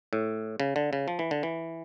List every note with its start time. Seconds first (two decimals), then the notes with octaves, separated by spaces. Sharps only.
0.13 A2
0.60 C#3
0.76 D3
0.93 C#3
1.08 F3
1.19 E3
1.31 D3
1.43 E3